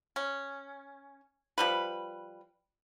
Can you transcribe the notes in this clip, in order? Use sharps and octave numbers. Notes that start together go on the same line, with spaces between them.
C#4
F3 G3 B4